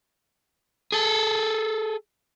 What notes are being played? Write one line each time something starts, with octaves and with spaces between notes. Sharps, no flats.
G#4 A4